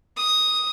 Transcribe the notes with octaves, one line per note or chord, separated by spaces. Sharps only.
D#6